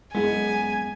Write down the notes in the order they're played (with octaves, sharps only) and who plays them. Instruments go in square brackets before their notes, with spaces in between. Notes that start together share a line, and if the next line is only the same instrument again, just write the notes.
[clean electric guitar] F#2 B3 [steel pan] G#3 E4 [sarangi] G#5